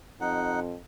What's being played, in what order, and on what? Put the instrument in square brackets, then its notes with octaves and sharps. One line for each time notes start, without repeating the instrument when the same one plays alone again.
[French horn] F2 [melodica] D#4 F#5